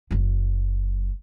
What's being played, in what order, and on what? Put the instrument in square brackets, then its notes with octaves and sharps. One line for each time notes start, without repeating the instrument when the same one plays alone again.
[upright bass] F#1 F#3